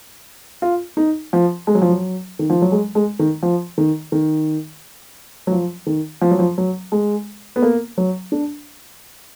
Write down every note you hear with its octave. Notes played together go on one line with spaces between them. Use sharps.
F4
D#4
F3
G#3
F#3
F3
F#3
D#3
F3
F#3
G#3
G#3
D#3
F3
D#3
D#3
F#3
F3
D#3
F3
F#3
F3
F#3
G#3
B3
A#3
F#3
D4